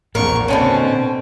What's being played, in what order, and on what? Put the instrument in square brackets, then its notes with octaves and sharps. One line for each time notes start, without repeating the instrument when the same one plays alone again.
[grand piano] A#1 E2 [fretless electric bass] A#2 [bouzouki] A#4 [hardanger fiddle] C#6
[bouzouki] B2 D3 C#4 [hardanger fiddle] C4 [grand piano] D#5 A5